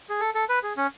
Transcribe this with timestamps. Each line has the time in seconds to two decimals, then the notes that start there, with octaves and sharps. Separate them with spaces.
0.09 G#4
0.20 A4
0.35 A4
0.49 B4
0.63 G#4
0.77 C#4